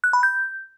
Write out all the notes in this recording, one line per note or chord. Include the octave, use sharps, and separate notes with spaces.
F#6
B5
G6